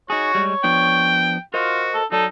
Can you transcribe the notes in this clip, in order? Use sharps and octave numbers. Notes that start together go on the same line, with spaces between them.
D#4 F#4 G#4 C#5
G3 G#3
F3 B3 D4 G5
F4 F#4 A#4 C5 D#5
A4
F#3 D#4 A4 D5